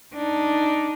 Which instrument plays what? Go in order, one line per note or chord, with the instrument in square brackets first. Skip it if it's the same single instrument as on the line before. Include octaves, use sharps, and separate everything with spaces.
[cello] D4 D#4